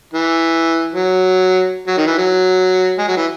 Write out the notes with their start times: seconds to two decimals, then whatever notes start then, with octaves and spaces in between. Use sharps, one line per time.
0.14 E3
0.94 F#3
1.87 F#3
1.97 D#3
2.07 E3
2.18 F#3
2.98 G#3
3.08 F#3
3.17 E3